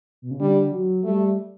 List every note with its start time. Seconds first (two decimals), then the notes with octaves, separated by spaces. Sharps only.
0.22 B2
0.31 C#3
0.40 D3 G3
0.72 F#3
1.03 G3 A3